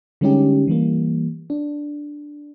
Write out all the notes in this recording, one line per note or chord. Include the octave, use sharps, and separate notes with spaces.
D3 G3 G#3 C#4 D#4 G4
E3 G3 A#3
D4